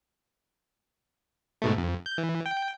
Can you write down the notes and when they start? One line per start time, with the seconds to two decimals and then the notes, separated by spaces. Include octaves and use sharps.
1.62 G#2 B2 A3
1.78 F2
2.06 G6
2.18 E3
2.46 G5